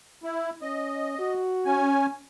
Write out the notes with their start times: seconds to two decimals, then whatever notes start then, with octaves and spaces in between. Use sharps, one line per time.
0.23 E4
0.62 C#4 D#5
1.19 F#4
1.65 C#4 G#5